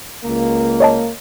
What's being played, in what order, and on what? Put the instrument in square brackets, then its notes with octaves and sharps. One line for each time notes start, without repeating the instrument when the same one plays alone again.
[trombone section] C#2 A#3
[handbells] C#5 D#5 A5